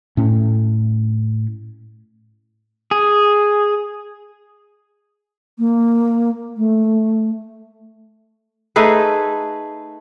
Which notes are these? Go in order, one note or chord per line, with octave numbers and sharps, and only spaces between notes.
A2 C#4
G#4
A#3
A3
A3 D#4 G#4 B4